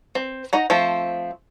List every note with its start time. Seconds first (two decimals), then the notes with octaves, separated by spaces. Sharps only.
0.15 C4
0.53 D#4 F#5 A#5
0.70 F3 A3 C4